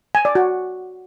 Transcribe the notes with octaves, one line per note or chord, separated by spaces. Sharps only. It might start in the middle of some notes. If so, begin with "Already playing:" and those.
G#5
D5
F#4